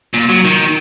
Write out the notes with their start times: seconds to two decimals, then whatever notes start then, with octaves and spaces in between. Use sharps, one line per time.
0.14 A#2
0.29 F#3
0.44 D#3